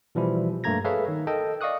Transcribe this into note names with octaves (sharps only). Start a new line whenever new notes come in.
B2 E3 F3 G3 E4
G2 A3 A#3 A#5 G#6 A#6
G#4 A4 B4 C#5 E5 F5
D#3
A4 A#4 D#5 G5 A5
D5 D#5 F5 C#6 D#6 F#6